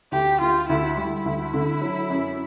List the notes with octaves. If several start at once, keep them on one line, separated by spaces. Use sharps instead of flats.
D2 G4
D2 F4
D2 E4
G3 E4
D2
D3
F#3
F#2